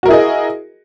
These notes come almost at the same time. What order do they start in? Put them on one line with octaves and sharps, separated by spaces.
F#4 A#4 E4 G#4 D#5